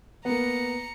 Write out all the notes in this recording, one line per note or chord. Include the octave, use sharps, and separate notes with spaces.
A#3 B3 A#5 C#7